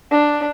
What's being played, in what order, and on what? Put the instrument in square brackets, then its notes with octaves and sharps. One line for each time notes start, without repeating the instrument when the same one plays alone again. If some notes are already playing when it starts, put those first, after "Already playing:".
[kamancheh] D4